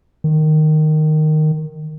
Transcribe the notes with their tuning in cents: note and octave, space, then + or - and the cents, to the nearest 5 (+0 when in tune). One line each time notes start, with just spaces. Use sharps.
D#3 -10